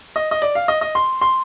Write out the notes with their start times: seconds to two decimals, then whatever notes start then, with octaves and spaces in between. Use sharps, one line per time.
0.16 D#5
0.31 D#5
0.42 D5
0.55 F5
0.68 D#5
0.81 D#5
0.95 C6
1.21 C6